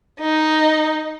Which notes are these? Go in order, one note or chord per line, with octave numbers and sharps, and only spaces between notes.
D#4